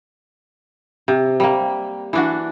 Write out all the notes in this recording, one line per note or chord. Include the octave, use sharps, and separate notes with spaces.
C3
G3 A#3
E3 D4 F#4